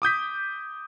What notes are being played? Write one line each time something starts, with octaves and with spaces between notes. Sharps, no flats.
D6 D#6 G6 B6